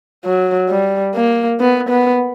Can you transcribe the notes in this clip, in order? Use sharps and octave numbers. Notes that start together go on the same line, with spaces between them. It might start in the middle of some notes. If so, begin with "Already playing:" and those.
F#3
G3
A#3
B3
B3